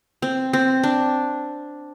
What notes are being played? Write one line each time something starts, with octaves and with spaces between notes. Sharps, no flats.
C4
C4
D4